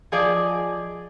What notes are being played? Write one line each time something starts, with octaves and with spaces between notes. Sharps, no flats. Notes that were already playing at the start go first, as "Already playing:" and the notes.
F3 G#4 D5 D#5